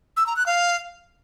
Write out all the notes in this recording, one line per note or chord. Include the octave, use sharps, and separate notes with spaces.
E6
A#5
F#6
F5